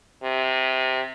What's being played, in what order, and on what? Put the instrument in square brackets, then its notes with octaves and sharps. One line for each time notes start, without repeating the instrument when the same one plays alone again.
[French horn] C3